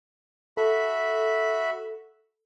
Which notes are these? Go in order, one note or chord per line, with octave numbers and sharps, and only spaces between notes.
F#4 A4 E5 B5